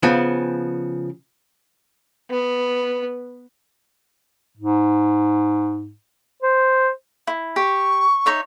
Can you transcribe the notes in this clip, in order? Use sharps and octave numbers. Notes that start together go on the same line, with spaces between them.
C#3 F3 B3
B3
G#2
C5
E4
G4 C#6
D#4 C#5 E5